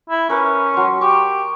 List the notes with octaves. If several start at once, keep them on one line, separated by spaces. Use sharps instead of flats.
E4
C#4 A#4 B4 D6
F#3 C6
G4 G5 C#6